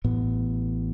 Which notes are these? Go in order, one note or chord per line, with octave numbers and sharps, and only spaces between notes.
A1 A2 B3